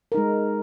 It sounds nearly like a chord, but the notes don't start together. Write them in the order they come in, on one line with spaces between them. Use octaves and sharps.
A#4 D#4 G#3